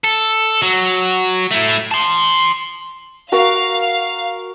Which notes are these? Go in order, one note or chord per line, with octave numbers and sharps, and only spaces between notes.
A4
F#3
A3 E4
A5 C6
F#4 A#4 F5 F#5